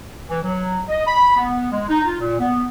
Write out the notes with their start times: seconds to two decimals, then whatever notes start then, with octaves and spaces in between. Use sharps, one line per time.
0.30 E3
0.44 F#3
0.88 D#5
1.06 B5
1.37 B3
1.72 G#3
1.88 D#4
2.05 F4
2.20 A#2
2.39 B3